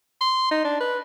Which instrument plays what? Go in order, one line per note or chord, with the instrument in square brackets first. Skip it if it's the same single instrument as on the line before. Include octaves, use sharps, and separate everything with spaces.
[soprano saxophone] C6
D#4
D4
B4